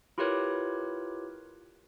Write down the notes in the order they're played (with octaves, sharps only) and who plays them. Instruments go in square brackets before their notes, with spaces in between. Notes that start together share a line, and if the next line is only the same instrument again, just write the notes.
[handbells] E4 F4 G4 A#4 B4 C#5